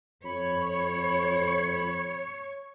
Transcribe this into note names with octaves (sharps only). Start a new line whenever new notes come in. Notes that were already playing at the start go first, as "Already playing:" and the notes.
F2 C#5 B5